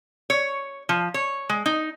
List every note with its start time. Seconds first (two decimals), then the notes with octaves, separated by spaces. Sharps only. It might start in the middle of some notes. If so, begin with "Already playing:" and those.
0.30 C#5
0.89 F3
1.14 C#5
1.49 G#3
1.66 D#4